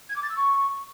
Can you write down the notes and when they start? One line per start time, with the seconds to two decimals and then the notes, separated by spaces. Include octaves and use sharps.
0.09 G#6
0.16 D6
0.23 A6
0.30 E6
0.36 C#6